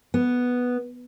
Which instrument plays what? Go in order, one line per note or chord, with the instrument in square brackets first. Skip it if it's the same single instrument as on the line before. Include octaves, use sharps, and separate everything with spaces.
[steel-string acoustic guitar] B3